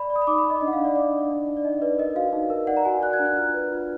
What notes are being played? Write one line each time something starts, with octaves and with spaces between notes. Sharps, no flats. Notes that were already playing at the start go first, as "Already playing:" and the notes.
Already playing: D5 B5
D5
D#6
B5
D#4 D6
B5
D#4
D#5
D4 D#5
F#5
F5
D4
D5
D4 D5
D4
D#4
D#4
D5
D#4 D#5
B4 D5
A#4 D#5
F#4 F5
D#4
A#4
D5 F#5
A#5
F#4 G#5
D5 F#6
G#6
D4
F#6
F4 F6
B4
F4